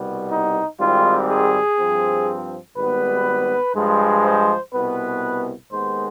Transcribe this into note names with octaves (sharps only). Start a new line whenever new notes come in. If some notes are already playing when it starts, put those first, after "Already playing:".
Already playing: C2 B2 G3 B3
D#4
G#1 G#2 G3 C4 F4
G#4
G2 F3 C4
G#1 G#2 G3 B3 B4
G2 F3 G#3
C5
C2 B2 B3 B4
D#2 D#3 G#3 B3 C5